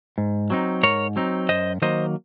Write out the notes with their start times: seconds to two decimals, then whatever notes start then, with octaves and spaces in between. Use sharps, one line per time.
0.18 G#2
0.50 F#3 C4 D#4
0.83 G#2 A#4 C#5
1.16 F#3 C4 D#4
1.49 F#2 C5 D#5
1.82 D#3 F#3 A#3 C5 D#5